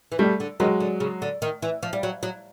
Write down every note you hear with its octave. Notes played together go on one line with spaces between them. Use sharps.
E3
D#3 G3 A3
D3
D#3 F#3 G#3
D3
C#3
D3
D#3
E3
F3
G3
F#3
F#3